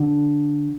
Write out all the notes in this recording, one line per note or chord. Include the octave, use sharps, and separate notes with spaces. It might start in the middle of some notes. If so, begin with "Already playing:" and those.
Already playing: D3